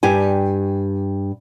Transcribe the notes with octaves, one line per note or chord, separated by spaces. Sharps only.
G2 G4 G#5